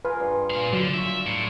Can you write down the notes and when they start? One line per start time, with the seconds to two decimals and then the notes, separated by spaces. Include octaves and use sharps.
0.05 F4 G#4 A#4 B4
0.20 G2
0.50 A#2 F5
0.73 D3 F#3
0.94 F4 C#5 E5
1.27 A2